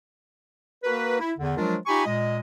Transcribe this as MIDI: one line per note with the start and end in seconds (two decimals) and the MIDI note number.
0.83 1.16 58
0.83 1.16 66
0.83 1.16 70
0.83 1.16 71
1.19 1.31 64
1.38 1.53 40
1.38 1.53 50
1.57 1.75 53
1.57 1.75 54
1.57 1.75 56
1.57 1.75 62
1.57 1.75 65
1.57 1.75 70
1.86 2.04 63
1.86 2.04 65
1.86 2.04 67
1.86 2.04 80
1.86 2.04 83
1.86 2.04 85
2.05 2.39 46
2.05 2.39 56
2.05 2.39 75